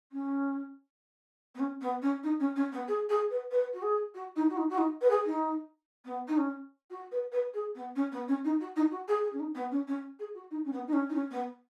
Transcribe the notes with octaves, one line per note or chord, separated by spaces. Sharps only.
C#4
B3
C#4
B3
C#4
D#4
C#4
C#4
B3
G#4
G#4
B4
B4
F#4
G#4
F#4
D#4
F#4
D#4
F#4
D#4
B4
G#4
D#4
B3
D#4
C#4
F#4
B4
B4
G#4
B3
C#4
B3
C#4
D#4
F#4
D#4
F#4
G#4
G#4
C#4
D#4
B3
C#4
C#4
G#4
F#4
D#4
C#4
B3
D#4
C#4
D#4
C#4
B3